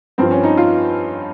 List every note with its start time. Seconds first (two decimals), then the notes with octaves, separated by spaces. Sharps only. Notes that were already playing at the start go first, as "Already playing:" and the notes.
0.18 G2 F3 C4
0.31 C#4
0.43 D#4
0.57 F4